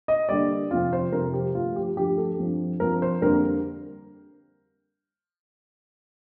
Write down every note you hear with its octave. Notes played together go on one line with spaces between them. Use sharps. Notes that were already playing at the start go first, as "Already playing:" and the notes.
D#5
D3 G3 A#3 D5
F2 C3 F3 C4 F4
C5
F2 C3 F3 C4 A#4
G4
G2 D3 F3 A3 F4
G4
G2 D3 F3 A3 G4
A4
G2 F3 C4
G2 F3 C4 A#4
C5
F2 D3 G3 A#3 A#4